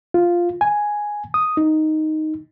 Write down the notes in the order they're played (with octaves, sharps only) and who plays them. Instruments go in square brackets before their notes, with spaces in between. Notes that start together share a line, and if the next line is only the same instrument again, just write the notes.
[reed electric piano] F4
G#5
D#6
D#4